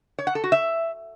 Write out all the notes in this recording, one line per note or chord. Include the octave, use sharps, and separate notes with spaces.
C#5
F#5
A4
F#4
E5